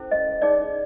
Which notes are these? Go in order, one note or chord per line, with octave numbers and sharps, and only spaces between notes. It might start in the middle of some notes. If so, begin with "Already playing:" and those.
Already playing: C#4 E4 A4 C5
D#5
D#4 G#4 C#5 D5